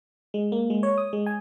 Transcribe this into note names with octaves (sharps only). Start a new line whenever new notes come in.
G#3
A#3
G#3
C#5
D#6
G#3
G#5